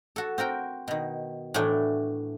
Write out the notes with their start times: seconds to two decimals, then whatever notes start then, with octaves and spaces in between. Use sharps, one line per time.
0.16 F#4 A4
0.38 C4 F#4 A#4 G5
0.88 B2 D#3
1.54 A2 E3 F#3 A3 D4